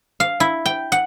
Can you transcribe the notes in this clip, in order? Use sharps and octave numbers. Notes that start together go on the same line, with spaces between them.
F5
E4
G5
F#5